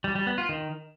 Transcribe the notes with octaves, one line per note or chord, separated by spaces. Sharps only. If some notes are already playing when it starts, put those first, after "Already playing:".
G3
G3
B3
F4
D#3